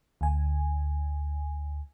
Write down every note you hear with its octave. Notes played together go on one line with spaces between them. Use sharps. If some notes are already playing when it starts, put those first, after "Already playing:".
D2 G#5